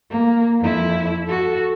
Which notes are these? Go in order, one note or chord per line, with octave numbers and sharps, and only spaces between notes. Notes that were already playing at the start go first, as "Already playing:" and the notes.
A#3
F2 E4
F#4 A4